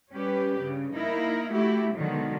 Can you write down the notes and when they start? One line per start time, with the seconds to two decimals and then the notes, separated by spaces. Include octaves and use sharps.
0.11 G3 C#4 G4 B4
0.60 G2 C#3
0.95 A#3 D#4 E4 A#4
1.52 A3 E4 F#4 G4
1.94 B2 D3 D#3 F#3 G#3